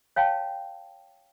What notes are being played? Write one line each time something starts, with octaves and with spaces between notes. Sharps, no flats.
C#5 F5 G5 A5